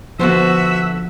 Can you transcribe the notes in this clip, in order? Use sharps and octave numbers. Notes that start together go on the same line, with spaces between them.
D3 F3 B3 F#4 C5 E5